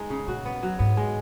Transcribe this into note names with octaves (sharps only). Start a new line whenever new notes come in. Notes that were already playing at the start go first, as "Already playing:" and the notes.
Already playing: G#3 D#4
C#3
A#2 F#4
B3
F#3
G#2 B3
G#3